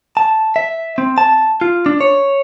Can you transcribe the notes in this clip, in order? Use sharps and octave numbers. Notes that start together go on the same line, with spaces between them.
A5
E5
C4
A5
F4
D4
C#5